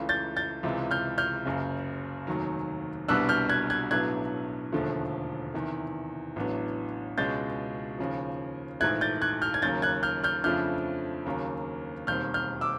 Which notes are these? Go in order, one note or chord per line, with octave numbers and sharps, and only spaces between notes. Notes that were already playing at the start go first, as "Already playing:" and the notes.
Already playing: C#2 C#3 E3 A3
G6 A6
G6 A6
C#2 C3 E3 G#3
F6 G6
F6 G6
F#1 F#2 C#3
F1 D#2 D#3 F#3
C2 B2 G3 B3 D4 E6 F#6
F6 G6
F#6 G#6
F#6 G#6
B1 A2 F#3 B3 D4 F#6 G#6
E1 D#2 D3 F3 A3
E2 C3 D#3
A1 A2 F#3 B3 D4
C#2 B2 G#3 C#4 G6 A6
D#2 C#3 F3
A#1 G#2 E3 A3 F#6 G#6
G6 A6
F#6 G#6
F6 G6
G#6
D#2 C#3 F#3 A#3 G6 A6
F#6 G#6
F6 G6
F6 G6
F2 C#3 F3 A3 D4 F6 G6
D#2 C#3 F#3 A#3
E1 D#2 D#3 G3 C4 F6 G6
F6 G6
D6 E6